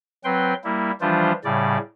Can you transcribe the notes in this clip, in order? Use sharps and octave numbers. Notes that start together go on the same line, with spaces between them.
F#3 C4 B4 G5 C6
G3 A#3 E4
E3 F3 G3 D4 F4 C5
A2 C#3 G3 D5